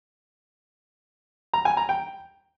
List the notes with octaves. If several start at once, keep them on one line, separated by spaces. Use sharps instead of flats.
A#5
G#5
A#5
G5